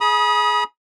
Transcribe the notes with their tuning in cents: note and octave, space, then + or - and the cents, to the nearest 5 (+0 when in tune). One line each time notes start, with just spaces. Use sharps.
G#4 +25 B5 -35 D#6 +10